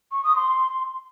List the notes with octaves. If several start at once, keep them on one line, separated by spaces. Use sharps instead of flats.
C#6
D#6
C6